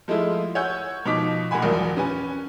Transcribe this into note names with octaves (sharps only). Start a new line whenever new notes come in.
F3 G#3 A3 E4 F4
C#5 F#5 G#5 E6 G6
B2 F3 D#4 D6 B6
A#2 A#4 F#5 G#5 B5
A#1 E2 F3 F#3
C#4 B4 G#5